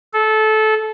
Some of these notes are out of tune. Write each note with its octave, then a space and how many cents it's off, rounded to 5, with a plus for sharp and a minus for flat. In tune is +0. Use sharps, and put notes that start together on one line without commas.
A4 -20